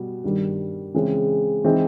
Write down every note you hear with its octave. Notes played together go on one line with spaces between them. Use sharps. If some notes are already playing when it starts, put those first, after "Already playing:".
Already playing: B2 G3
G2 D#3 G3
C#3 E3 G#3 C4
E3 G#3 C4 D#4